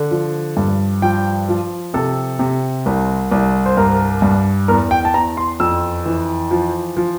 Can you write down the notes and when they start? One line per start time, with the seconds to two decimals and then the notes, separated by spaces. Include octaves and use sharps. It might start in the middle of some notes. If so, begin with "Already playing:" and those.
Already playing: D3
0.11 F3
0.57 G2
1.02 F3 G5
1.49 F3
1.94 C3 A4
2.39 C3
2.86 C2
3.32 C2
3.66 C5
3.77 G2 A#4
4.22 G2
4.68 E2 A#4
4.91 G5
5.05 A5
5.14 E2 A#5
5.37 C6
5.60 F2 E6
6.06 E3
6.51 F3
6.97 F3